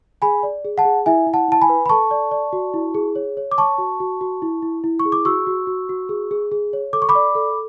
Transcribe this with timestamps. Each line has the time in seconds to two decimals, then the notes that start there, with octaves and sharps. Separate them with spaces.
0.22 G#4 G#5 B5
0.43 D5
0.65 G#4
0.78 F#5 A5
0.85 G#4
1.06 E4 E5 G#5
1.27 E4
1.34 F#5 A5
1.48 E4 A5
1.62 G#5 B5
1.69 B4
1.86 B5
1.89 A4 A5 C#6
2.11 D5
2.31 D5
2.53 F#4
2.74 E4
2.95 G#4
3.16 C#5
3.37 C#5
3.51 D6
3.58 C#5 A5 C#6
3.78 F#4
4.00 F#4
4.21 F#4
4.42 E4
4.62 E4
4.84 E4
5.00 C#6
5.05 G#4
5.12 D6
5.25 F#4 C#6 E6
5.47 F#4
5.67 F#4
5.89 F#4
6.09 G#4
6.31 G#4
6.52 G#4
6.73 C#5
6.93 A4 D6
7.02 C#6
7.09 B5 D6
7.15 D5
7.35 A4